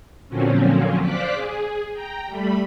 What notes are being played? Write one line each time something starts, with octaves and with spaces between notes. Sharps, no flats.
A#2 D3 F3 F#3 C4 C#4
C5 D5 F5 D6 F#6 B6
G#4
G5 A#5
G3 A3 B5